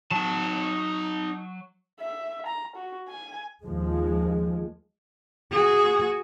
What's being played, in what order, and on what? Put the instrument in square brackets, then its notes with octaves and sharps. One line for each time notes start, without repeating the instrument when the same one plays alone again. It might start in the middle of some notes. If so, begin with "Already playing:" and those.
[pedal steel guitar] F#3 [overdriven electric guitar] D#4 A5
[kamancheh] E5
A#5
F#4
G#5
[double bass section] D#2 F3 G#3
[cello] F#4 G#4